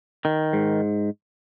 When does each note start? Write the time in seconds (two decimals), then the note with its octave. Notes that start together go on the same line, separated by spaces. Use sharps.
0.25 D#3
0.53 G#2